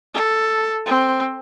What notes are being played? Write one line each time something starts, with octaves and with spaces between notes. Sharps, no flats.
A4
C4